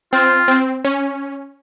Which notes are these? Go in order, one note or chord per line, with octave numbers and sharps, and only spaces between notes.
C4 F4
C4
C#4